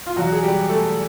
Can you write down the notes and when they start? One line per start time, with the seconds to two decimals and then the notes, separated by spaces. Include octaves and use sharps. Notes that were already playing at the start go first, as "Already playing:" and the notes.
0.06 F4
0.16 E2 B2 F#3 F#4
0.32 G#4
0.43 G3 G4
0.69 A3 A4